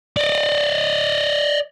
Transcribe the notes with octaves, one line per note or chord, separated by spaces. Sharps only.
D5 D#5